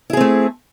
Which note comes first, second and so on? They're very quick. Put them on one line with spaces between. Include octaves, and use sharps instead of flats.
E4 G#4 C4 A3